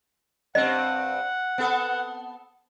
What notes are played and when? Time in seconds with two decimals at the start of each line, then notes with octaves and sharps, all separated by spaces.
0.55 G2 C4 D#5 F#5
1.58 B3 A4